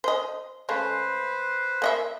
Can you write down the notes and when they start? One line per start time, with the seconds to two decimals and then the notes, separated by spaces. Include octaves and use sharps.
0.04 C5 D#5
0.69 C#3 G#3 A3 B4 C5
1.82 A#3 D#5 E5